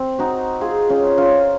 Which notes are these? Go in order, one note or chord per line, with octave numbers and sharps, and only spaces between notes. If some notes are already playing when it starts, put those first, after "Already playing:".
Already playing: C4
D#4 F#4
F4 G#4
C#4 F4
C#4 F4